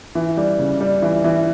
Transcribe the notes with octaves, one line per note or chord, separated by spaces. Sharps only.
E3
G3
C#3
G3
E3
E3